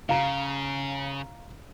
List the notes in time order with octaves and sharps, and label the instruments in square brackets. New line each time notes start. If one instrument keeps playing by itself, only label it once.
[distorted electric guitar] C#3 [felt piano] F5 A#5